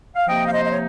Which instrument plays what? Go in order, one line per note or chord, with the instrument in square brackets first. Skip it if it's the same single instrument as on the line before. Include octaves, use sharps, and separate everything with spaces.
[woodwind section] F5
C3 F3 A#3 D#4 D#5 G5
F5
C5 D#5
D#5
C#5